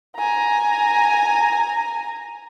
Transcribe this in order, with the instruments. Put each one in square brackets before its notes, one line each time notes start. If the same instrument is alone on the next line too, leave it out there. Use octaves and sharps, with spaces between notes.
[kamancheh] G#5 A#5